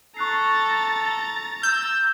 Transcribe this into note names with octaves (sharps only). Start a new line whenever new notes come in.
A4 A#5 C#6 F#6 A6 C7
E6 G6